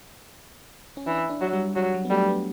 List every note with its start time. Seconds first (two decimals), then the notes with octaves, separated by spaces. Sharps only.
0.97 C#4
1.06 E3 D4
1.29 D4
1.41 F#3
1.53 G3
1.76 F#3 G3
1.94 F#3
2.05 B3
2.10 G3 A3
2.29 B3